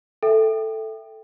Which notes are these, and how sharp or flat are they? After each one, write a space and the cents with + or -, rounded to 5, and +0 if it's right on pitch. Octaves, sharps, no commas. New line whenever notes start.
A4 +0 E5 +0 G5 +0